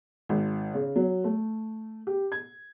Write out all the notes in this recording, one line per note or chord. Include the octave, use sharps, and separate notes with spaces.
G#1
C#3
F#3
A3
G4
G#6